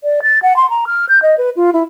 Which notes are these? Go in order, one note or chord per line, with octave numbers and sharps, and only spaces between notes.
D5
A6
F#5
C6
A#5
F6
G6
D#5
B4
F4
E4